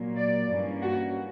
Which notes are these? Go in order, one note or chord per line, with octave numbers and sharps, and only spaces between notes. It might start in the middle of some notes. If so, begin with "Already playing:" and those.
Already playing: A#2 F#3 A#3
D5
G2 E3 A#3 C#4
F#4